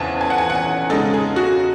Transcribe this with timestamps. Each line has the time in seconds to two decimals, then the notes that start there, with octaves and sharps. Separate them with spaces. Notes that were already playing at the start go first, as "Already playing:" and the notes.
Already playing: E2 C#3 E3 C4 G#5 A5
0.21 G#5
0.30 F#5
0.38 G#5
0.50 F#5
0.55 G#5
0.90 C#3 G#3 D#4 A4
1.13 G#4
1.36 F#4